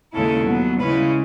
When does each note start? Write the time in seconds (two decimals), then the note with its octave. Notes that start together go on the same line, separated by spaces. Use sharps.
0.14 D#2 C#3 G#3 C#4 E4 A4
0.46 B2 F#3 B3
0.79 C#3 G#3 C#4 E4 B4